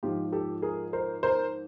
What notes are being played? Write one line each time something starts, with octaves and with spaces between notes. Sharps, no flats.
G#2 F3 F4 G4
G4 A4
G#4 A#4
A#4 C5
A#4 C5